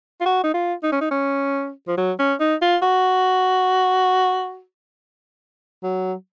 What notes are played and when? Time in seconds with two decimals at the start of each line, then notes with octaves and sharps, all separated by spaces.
0.21 F4
0.26 F#4
0.44 D#4
0.54 F4
0.83 D#4
0.92 C#4
1.01 D#4
1.11 C#4
1.88 F3
1.97 F#3
2.19 C#4
2.40 D#4
2.62 F4
2.82 F#4
5.83 F#3